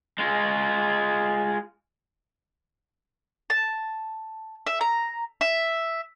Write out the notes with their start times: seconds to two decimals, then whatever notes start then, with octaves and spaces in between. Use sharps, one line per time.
0.19 G#3 F4
3.50 A5
4.67 E5
4.81 A#5
5.41 E5